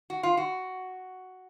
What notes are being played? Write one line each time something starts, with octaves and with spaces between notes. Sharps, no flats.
F#4
F4
F#4